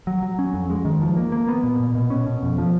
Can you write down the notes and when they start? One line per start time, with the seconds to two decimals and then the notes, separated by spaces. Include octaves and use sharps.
0.07 F#3
0.22 F#3
0.39 C#4
0.54 F2
0.70 G#3
0.85 D#3
1.01 F3
1.16 A#3
1.32 A#3
1.49 B3
1.64 A#2
1.80 A#2
1.95 B2
2.10 C#4
2.27 B2
2.43 F2
2.58 F3